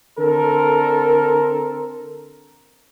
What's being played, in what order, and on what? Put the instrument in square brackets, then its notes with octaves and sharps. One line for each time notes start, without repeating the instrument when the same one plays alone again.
[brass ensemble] D3 C4 A4 A#4